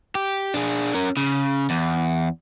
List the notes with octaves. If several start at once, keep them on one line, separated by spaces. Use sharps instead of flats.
G4
D4 G#4
C#4 A#4
C#3
E2